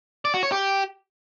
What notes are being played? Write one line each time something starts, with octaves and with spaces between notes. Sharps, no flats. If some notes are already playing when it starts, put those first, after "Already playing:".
D5
F#4
C#5
G4